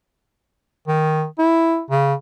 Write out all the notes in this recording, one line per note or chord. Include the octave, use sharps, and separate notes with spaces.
D#3
E4
C#3